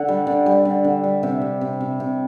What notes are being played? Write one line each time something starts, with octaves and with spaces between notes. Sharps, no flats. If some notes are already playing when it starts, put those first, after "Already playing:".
Already playing: D3 F#5
G3
D3
G3
D3
D3
G3
C3 E5
C3
C3
C3
C3